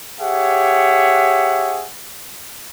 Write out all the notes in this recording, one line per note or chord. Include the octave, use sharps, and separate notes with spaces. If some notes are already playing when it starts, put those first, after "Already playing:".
G4 G#4 C#5 E5 F#5